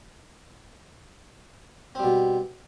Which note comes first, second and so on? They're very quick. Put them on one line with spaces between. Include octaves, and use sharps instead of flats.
C4 G3 B2